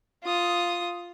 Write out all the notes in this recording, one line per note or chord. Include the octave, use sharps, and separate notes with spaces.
F4 D#6